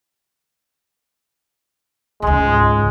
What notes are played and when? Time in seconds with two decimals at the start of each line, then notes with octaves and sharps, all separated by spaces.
2.22 C#2 G#2 G#3